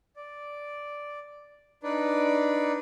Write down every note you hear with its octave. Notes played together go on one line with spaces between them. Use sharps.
D5
D4 D#4 B4 D5